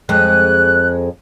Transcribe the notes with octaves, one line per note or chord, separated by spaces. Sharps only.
F2 G#3 F#6